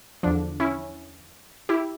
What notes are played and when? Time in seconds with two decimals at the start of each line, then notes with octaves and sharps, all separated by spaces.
0.23 E2 D3 F3 D4
0.60 C#4 E4
1.69 E4 G4